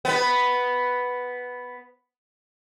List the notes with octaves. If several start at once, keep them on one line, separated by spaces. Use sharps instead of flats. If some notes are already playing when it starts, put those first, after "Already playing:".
B3 B4